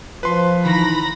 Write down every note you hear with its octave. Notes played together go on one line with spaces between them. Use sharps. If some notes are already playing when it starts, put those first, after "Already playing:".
F3 B4 C6
D#3 E3 A#5 B5 A#6